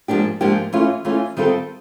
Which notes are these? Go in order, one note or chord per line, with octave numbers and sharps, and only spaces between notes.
G#2 F3 A#3 D4 G4
G#2 F3 A#3 D4 G4
E3 A3 C#4 F4
E3 A3 C#4 F4
D#3 G3 C4 F4 A4